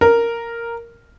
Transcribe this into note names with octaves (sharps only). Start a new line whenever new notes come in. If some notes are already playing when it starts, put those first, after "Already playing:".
A#4